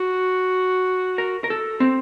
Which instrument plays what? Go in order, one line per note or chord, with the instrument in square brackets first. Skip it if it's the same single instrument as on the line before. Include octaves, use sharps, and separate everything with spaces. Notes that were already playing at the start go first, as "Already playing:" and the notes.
Already playing: [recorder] F#4
[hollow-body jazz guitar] A#4
A#4
A4
C4